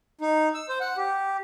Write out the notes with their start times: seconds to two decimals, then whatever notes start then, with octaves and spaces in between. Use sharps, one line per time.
0.21 D#4
0.54 E6
0.69 C5
0.81 F#5
0.97 G4